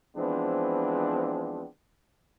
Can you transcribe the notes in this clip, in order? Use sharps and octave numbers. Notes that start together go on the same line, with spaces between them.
E3 F3 G#3 B3 C4 D4